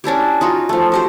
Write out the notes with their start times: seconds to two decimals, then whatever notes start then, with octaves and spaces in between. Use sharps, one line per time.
0.04 C#4 D4 E4 G4
0.41 D#4 F4 F#4
0.69 F3 A3
0.92 F#4 G4 C5